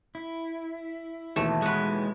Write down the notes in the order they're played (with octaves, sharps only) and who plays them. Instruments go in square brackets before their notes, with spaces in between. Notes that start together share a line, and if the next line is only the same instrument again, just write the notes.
[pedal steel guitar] E4
[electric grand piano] D#2 B2 E3 [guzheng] A3
[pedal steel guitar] G#3 [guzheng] F#4 B4